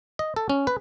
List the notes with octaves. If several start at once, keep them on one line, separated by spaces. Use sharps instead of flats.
D#5
A4
C#4
B4